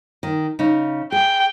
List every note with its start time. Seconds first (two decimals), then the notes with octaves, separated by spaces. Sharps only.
0.23 D#3
0.59 C#3 D#4
1.12 G#4 G5